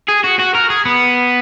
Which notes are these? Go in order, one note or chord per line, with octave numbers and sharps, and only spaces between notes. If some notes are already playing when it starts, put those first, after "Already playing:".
G#4
F#4
F#4
A#4
G#4
B3